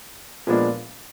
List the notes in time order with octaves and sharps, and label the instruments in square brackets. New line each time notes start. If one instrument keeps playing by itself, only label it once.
[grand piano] A#2 F3 G#3 B3 D4